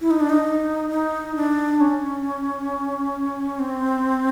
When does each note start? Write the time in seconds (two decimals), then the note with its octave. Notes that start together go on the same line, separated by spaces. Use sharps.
0.01 E4
0.11 D#4
0.20 D4
0.30 D#4
0.90 D#4
1.35 D4
1.81 C#4
3.59 C4